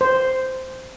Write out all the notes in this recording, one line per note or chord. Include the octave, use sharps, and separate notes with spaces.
C5